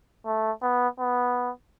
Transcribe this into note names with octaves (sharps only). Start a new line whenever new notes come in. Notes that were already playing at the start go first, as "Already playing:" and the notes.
A3
B3
B3